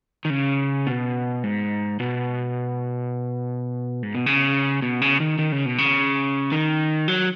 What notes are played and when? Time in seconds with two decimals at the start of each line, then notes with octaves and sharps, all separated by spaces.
0.25 D#3
0.30 C#3
0.87 B2
1.43 G#2
2.00 B2
4.03 G#2
4.15 B2
4.26 C#3
4.82 B2
5.02 C#3
5.20 D#3
5.39 D#3
5.52 C#3
5.66 B2
5.78 C#3
6.52 D#3
7.08 F#3